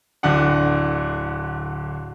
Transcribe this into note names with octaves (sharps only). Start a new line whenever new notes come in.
D1 D3 D4 F#5